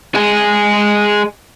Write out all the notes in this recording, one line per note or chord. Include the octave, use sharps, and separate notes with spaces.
G#3 G#4